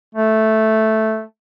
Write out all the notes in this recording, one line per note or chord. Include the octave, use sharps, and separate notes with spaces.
A3